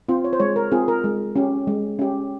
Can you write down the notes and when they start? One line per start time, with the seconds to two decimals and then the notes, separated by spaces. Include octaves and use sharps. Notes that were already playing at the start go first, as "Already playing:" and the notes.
0.09 C4 F4 C5
0.24 C#5
0.33 C5
0.40 G#3 C#5
0.56 A#4
0.72 C4 F4 G#4
0.88 A#4
1.04 G#3
1.36 C#4 G4
1.67 G#3
1.99 C#4 G4